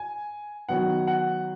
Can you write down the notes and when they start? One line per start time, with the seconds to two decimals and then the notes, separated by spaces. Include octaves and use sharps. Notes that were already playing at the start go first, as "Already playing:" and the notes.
Already playing: G#5
0.69 D#3 F#3 B3 F#5
1.07 F#5